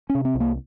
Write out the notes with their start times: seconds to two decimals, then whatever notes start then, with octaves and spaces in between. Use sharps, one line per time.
0.10 C#4
0.15 C3
0.25 C4
0.35 C2
0.40 A#3